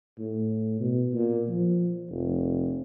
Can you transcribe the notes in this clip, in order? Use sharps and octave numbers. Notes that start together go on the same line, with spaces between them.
A2
B2
A#2
F3
F1